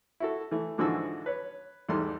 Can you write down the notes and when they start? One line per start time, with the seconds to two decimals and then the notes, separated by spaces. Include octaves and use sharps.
0.20 E4 F#4 A4
0.51 E3 A3
0.78 G#2 D3 E3 F3 F#4 E6
1.26 B4 C#5
1.89 E2 G#2 G3 A3 A4 C6